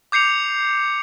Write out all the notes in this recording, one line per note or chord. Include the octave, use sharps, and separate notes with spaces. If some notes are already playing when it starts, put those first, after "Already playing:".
D6 G6 C7 C#7 F7